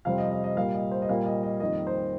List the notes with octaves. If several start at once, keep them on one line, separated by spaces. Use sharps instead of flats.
F2 C3 G3 C4 F5
D#5
D#5
D#5
A#2 G3 A#3 F5
D#5
C5
D#5
A#2 G3 A#3 F5
D#5
D#5
F2 D#3 G3 A#3 D#5
C5